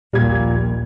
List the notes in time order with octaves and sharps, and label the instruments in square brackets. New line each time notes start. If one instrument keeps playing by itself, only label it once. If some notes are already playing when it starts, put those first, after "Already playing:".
[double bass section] A#1 D#2 [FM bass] A#2 [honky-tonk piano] G3 G#6